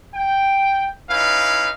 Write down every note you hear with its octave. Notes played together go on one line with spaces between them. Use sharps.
G5
C#4 D#4 E4 B4 F5